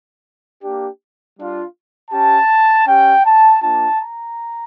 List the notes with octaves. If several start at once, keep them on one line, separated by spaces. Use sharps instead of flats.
A#3 D4 G4
G3 D4 F4
C#4 G4 A5
C#4 G4 G5
A5
A#3 D4 F4 A5
A#5